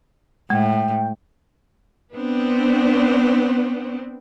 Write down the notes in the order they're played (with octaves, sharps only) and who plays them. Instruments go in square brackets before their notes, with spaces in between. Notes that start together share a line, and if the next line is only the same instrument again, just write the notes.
[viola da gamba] A2 [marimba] G#3 [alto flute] G5
[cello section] B3 C4 D4